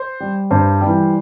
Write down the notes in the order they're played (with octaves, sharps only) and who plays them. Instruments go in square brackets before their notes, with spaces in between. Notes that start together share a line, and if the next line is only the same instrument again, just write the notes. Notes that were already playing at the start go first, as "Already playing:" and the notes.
Already playing: [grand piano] C5
G3
G2 C5
G3
E3